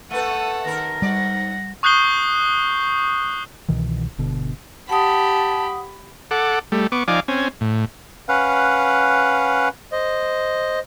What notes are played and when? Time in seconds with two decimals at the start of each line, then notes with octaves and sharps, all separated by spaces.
0.11 A3 A4 B4 F#5 D#7
0.64 D#2 A#4 A#6
1.02 G#2 G3 D5 F#5
1.83 C#6 D#6 F#6 G6 C7 G7
3.68 C2 B2 D#3 E3
4.18 G1 B2 D3
4.89 G4 F#5 A5 B5 D#6
6.31 A4 F#5 D6
6.72 G3 A3
6.92 B3 C#6 D6
7.08 F3 D#4 D5 F5 G#5 D6
7.28 C4 C#4 G#5
7.61 A2
8.29 C#4 B4 F5 F#5
9.92 C5 D#5